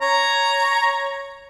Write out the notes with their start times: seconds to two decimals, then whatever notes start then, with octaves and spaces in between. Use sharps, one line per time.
0.02 C#5 A#5